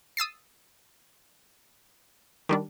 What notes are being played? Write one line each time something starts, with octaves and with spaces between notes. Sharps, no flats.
D#6 E6 A6 C7
D#3 G3 D4